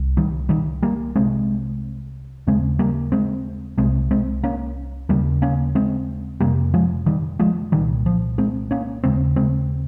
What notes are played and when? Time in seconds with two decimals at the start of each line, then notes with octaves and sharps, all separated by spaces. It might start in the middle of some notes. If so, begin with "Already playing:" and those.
Already playing: C2
0.17 D#3 G3
0.49 D#3 G3
0.82 G3 A#3
1.16 C2 C3 G#3 C4
2.47 D#2 C#3 G#3 C4
2.79 G3 A#3
3.12 G#3 C4
3.77 C2 C3 G#3 C4
4.11 G#3 C4
4.43 A#3 C#4
5.09 D#2 C#3 G3 A#3
5.42 A#3 C#4
5.75 G#3 C4
6.40 F2 C3 G3 A#3
6.74 F3 G#3
7.06 D#3 G3
7.39 F3 G#3
7.72 C2 A#2 D#3 G3
8.06 F3
8.38 G#3 C4
8.71 A#3 C#4
9.04 D#2 C#3 G#3 C4
9.36 G#3 C4